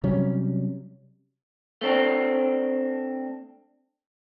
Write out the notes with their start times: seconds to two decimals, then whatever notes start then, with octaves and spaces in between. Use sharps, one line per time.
0.04 C3 F#3 G3 C#4
1.81 A3 C4 D4